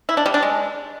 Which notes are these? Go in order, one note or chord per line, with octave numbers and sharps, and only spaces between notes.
E4
D4
G3
D4
G#3